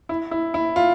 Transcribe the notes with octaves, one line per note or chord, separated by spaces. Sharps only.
E4
E4
E4
F4